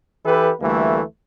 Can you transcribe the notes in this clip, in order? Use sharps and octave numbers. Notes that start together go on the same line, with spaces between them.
E3 G4 A4 B4
D2 E3 G3 A3 A#3